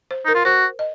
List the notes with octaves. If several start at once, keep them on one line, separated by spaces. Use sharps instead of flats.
C5
D#4 A#4
F4
F#4 C5
D#5